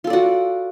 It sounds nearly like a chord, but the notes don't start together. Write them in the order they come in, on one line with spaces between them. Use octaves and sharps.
F4 A4 D5 F#4